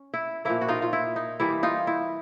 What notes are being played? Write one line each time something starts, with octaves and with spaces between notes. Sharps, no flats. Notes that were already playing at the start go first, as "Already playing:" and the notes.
Already playing: C#4
E4
A#2 F3 A#3 E4
F#4
D#4 F4
F4
E4
D#4
E3 G3 A#3 E4
D#4 F4
E4